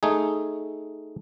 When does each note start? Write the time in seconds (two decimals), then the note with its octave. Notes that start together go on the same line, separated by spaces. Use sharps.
0.03 A3 D#4 G#4